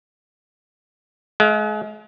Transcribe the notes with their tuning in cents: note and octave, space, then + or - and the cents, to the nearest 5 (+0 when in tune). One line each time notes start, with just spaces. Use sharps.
G#3 +40 F5 +0